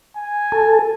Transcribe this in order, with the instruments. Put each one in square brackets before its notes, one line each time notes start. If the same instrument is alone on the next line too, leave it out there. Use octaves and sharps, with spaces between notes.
[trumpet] G#5
[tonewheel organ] A4